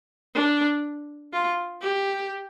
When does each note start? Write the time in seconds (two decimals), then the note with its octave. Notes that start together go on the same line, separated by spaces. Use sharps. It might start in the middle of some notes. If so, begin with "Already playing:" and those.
0.35 D4
1.33 F4
1.82 G4